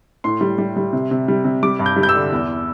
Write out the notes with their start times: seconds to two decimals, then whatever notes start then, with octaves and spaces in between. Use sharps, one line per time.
0.24 A2 C6
0.41 G3
0.58 G3
0.76 G3
0.93 C3
1.11 C3
1.28 G3
1.44 C3
1.63 G3 D6
1.79 G2
1.86 G6
1.96 G3
2.03 G6
2.09 E6
2.15 D3
2.32 E2